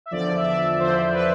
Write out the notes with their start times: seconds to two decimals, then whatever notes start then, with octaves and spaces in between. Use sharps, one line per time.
0.06 E5
0.11 E2 D3 F3 D5
0.36 E5
0.46 D5
0.79 E2 D3 F3 C5
1.13 B4